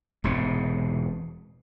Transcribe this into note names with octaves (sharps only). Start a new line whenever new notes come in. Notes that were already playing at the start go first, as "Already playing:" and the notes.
E1 G#2 C3